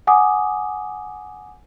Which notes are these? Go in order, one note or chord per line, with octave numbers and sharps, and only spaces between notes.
F#5 G#5 D6 D#6